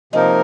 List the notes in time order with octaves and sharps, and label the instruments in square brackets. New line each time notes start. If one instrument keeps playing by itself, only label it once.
[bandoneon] C3 F3 A#3 D#4 A#4 [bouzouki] G#3